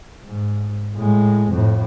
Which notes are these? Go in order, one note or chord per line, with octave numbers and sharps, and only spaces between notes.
G#2
A2 G#3
F2 A2